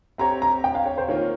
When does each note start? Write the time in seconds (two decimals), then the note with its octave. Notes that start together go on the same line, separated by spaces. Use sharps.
0.18 C4 G4 C#5 A#5
0.42 A#5
0.64 G5
0.75 F5
0.86 C#5
0.98 C5
1.09 D#3 A#3 F4 C#5